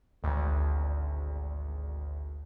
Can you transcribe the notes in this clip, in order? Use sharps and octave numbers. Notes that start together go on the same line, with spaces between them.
G#1 D2